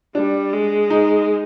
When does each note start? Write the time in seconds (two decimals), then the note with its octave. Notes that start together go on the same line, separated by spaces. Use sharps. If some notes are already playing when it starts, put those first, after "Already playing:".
0.15 G3 D4
0.53 G#3
0.90 D#4